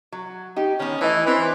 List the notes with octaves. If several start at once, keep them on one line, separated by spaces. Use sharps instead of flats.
F#3
D#4 G4
D#3 B3 C#4
E3 A3 D#5
E3 C4 D4 C5